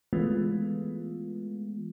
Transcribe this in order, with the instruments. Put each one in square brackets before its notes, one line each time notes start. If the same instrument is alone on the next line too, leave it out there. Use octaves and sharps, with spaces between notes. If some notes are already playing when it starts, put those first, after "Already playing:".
[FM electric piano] E3 G#3 A3 B3 F4